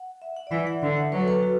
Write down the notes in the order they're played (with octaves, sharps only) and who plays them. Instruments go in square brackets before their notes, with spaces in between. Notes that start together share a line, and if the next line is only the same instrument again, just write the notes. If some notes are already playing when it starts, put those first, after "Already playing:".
Already playing: [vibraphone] F#5
E5
F#5
D5
[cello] E3 [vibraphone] E5
[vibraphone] F#5
[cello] D3 [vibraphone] E5
[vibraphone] F#5
[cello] F#3 [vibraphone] B4
[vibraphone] A4
B4
F#4